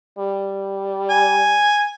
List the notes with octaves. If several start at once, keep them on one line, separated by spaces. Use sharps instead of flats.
G3
G#5